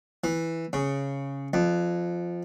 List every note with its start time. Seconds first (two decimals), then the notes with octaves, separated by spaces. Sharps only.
0.24 E3
0.73 C#3
1.53 F2